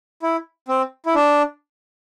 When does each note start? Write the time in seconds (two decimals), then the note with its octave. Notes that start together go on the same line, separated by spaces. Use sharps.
0.22 E4
0.68 C4
1.06 E4
1.15 D4